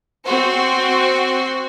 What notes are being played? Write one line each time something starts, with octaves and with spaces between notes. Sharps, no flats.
C4 F#4 C5